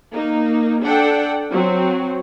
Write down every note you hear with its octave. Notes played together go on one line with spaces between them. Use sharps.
A#3 D#4
D4 A4 F#5 G5
F#3 C4